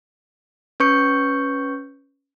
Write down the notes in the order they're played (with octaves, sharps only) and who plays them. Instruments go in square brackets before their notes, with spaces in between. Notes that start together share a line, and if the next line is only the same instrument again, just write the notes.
[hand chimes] C#4 B4 C#6 G6 C#7